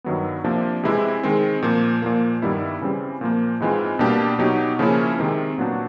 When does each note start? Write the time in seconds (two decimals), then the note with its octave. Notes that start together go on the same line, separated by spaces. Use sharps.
0.04 G2 D#3 F#3 B3
0.44 C3 F3 A#3 D4
0.83 C3 E3 G#3 C4 E4
1.23 D#3 G#3 C4
1.62 A#2 F3 A#3
2.02 A#2 F3 A#3
2.42 G2 D#3 G3 B3 E4
2.81 C#3 E3 G3 C4
3.21 A#2 F3 A#3
3.60 G#2 E3 G#3 C4 F4
3.99 B2 G3 A#3 D4 G4
4.39 B2 F#3 B3 D#4 G4
4.79 C#3 F3 A#3 C#4 E4
5.18 C3 D#3 G#3 C4
5.58 A#2 F#3 B3 D4 F#4